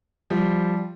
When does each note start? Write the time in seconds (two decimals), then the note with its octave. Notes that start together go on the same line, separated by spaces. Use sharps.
0.30 F3 G3